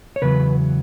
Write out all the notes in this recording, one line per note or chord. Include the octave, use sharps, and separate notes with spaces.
C#5
E2 C#3 F#3 B3 B4